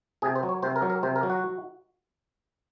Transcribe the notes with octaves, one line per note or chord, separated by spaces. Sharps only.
C3 G#4
C5
F#3
C#5
C3 C5
A#4
F#3
A#4
C3 C5
A#4
F#3
F#4